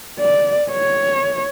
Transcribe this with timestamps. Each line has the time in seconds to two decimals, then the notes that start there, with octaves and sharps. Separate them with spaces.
0.19 D5
0.71 C#5